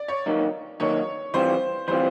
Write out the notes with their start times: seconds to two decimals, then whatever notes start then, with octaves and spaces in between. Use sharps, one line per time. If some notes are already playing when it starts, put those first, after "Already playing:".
Already playing: D5
0.08 C#5
0.26 D#2 D#3 F#3 A#3 D#4
0.80 D#2 D#3 F#3 A#3 D#4 C#5
1.34 E3 G3 C4 F4 C5
1.88 E3 G3 C4 F4 C5